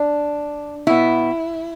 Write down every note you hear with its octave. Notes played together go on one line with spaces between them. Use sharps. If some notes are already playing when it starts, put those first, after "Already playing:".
Already playing: D4
B2 B3 E4